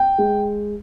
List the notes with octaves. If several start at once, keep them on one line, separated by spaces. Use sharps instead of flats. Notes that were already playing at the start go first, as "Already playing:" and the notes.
Already playing: G5
G#3